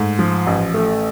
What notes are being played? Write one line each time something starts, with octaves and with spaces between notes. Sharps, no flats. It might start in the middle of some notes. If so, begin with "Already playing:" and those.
Already playing: G#2 A3
F3
A1
A3